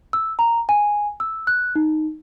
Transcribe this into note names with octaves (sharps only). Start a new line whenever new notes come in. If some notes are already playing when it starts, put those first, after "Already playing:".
E6
A#5
G#5
E6
F#6
D#4